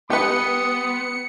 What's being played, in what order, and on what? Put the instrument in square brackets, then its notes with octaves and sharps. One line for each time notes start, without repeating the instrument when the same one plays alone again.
[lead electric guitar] B3 [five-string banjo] G4 B4 [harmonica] C6 D#6 [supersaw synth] C#7